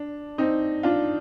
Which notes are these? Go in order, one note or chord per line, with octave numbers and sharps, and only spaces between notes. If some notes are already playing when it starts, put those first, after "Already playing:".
Already playing: D4
C4 D#4
D4 F4